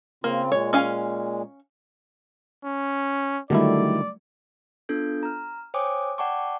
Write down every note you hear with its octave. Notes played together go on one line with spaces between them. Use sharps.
C#3 A#3 C4 F4
A#2 G#3 C#5
C#4 F5 G#5
C#4
D3 D#3 F#3 G3 A3 E4 D5
B3 D4 F4 A4 G6
A#5 F6
C5 C#5 G5 G#5 D6 D#6
D5 F#5 G5 A5 C#6 D6
C#6